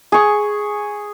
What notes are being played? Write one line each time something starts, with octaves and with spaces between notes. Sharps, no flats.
G#4 C#6